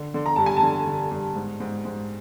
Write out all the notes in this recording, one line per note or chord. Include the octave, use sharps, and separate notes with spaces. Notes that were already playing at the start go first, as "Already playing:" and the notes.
Already playing: D3
D3
A#5
G2 A5
G#5
A5
D3
D3
G2
G#2
G#2
G#2